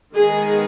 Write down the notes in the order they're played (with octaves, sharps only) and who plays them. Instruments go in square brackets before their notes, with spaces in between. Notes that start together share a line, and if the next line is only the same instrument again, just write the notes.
[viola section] D#3 G#3 B3 G#4